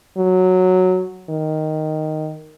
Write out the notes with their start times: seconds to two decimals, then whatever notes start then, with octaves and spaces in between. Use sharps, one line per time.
0.17 F#3
1.30 D#3